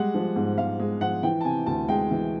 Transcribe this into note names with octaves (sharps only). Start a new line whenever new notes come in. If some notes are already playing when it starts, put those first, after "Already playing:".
Already playing: G3 G#3 F#5
F3
G#2
G#2 F5
G#3
F3 F#5
E3 G5
A5
C3 G#5
D2 A5
G#3 G5
E3